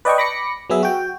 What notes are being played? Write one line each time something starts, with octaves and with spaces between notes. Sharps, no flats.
B4 D5 D#5 G5 A5 C#6
B5 D6 A#6 B6 C#7
F#3 B3 G#4 E5
F#4 G5